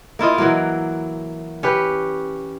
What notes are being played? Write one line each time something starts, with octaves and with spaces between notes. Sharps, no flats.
A#3 E4 F4 D#5
E3 F#3 A#3
C#4 G4 B4